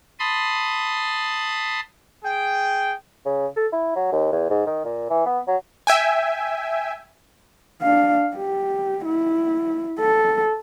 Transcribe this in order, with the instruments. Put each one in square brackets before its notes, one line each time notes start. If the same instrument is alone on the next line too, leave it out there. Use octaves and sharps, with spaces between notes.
[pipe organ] A5 B5 C6 D#6
[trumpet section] G#4 G5
[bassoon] C#3
A4
E4
F#3
D#2
E2
G#2
D#3
A#2
E3
B3
F#3
[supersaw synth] E5 G5 G#5
[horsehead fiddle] D4 F5
G4
E4
A4